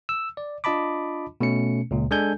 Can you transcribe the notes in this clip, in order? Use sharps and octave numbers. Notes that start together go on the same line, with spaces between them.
E6
D5
D4 F4 D#5 A5 B5 D6
B2 A3 C#4 C#7
C#2 A#2
G#3 D4 A4 G#5 G6